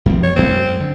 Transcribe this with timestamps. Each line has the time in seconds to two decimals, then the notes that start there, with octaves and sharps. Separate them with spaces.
0.06 F#2 F3 C4
0.23 C#5
0.36 F#2 F#3 G#3 C4
0.80 D3